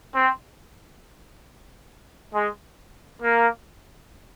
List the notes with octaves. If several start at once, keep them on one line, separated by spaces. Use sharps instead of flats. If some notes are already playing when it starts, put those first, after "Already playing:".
C4
G#3
A#3